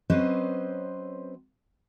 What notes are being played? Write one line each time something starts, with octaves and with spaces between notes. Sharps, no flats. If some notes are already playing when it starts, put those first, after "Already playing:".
F#3 C4 C#4 B4 C5 D#5